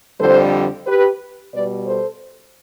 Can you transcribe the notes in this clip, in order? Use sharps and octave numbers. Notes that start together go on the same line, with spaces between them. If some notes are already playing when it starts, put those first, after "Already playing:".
F2 D3 G3 A4 C5
G4 B4
B2 G3 B4 D5
A4 C5